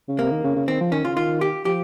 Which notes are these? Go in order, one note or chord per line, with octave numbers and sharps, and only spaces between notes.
C#3
C3 A#3
D#3
C#3
C#3
D#3 C4
F3
D#3 C#4
C#3 F4
D#3 F4
G4
F3 G4